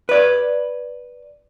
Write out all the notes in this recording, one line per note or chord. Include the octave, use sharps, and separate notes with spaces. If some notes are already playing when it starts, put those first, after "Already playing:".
B4 D5